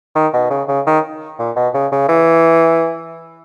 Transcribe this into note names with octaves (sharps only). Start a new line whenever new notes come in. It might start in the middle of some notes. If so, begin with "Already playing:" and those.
D#3
B2
C#3
C#3
D#3
A#2
B2
C#3
C#3
E3